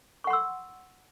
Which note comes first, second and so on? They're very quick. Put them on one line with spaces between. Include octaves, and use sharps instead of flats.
C#6 F#5 C6 E6